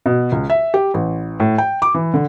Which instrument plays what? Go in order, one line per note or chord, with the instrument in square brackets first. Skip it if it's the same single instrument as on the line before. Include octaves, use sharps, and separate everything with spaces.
[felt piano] B2
C#2
E5
G4
A1
A2
G5
D6
E3
D3